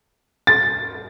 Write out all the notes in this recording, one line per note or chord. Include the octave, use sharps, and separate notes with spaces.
A6